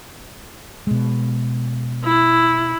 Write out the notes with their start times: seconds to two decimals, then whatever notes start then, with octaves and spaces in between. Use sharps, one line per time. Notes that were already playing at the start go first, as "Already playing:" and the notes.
0.87 B2 G#3
2.05 E4